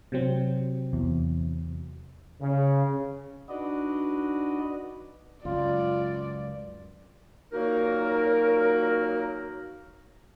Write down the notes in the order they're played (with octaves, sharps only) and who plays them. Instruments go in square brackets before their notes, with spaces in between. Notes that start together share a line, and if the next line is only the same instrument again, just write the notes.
[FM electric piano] C3 F#3 C4
[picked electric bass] E2
[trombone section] C#3
[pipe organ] D4 D#4 F#4 B4 D5 D#5
[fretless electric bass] C#2 F#2 [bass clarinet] F4 [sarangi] D5
[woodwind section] A#2 F#3 A#3 D#4 F#4 A#4